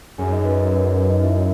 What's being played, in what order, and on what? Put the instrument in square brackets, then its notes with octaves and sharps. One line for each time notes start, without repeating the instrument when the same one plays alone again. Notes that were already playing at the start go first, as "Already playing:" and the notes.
[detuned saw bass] F#2 [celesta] G#4 G#5
[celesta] D#4 D#5
B4
A#4
B4
A#4
B4
D#4 D#5
E4 E5